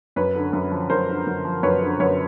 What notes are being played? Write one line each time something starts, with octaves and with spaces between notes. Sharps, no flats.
F#2 B4 C#5
D3
F#2
F3
F#2 A#4 C5
D3
F#2
F3
F#2 B4 C#5
D3
F#2 B4 C#5